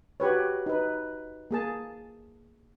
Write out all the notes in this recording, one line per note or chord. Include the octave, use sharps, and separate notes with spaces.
F#4 G4 B4 C#5
D#4 B4
A#3 G#4 A5